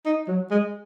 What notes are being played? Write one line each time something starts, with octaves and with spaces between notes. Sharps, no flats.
D#4
F#3
G#3